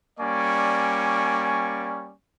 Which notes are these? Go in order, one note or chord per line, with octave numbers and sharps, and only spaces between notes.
G3 A#3 C#4 D5 G#5 C#6